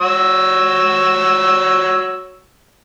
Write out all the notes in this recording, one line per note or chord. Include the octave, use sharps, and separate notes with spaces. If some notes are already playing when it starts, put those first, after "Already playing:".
F#4 C#5 E6